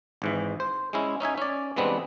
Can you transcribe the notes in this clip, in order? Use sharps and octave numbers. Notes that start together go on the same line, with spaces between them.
G#1 G#2 E3
C5
G#3 C#4 E4
C#4 D#4 E5 G#5
C#4 D5
E3 G3 G#3 B3 C4 D4